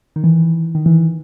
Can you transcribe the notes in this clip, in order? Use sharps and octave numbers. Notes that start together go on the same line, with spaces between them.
D#3
E3
D#3
E3